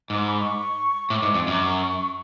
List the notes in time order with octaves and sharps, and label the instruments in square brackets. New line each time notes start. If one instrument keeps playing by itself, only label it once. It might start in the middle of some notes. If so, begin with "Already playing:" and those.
[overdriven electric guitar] G#2 [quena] D6
[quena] B5
D6
C#6
[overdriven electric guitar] A2 [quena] D6
[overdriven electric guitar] G#2
F2
F#2
[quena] C#6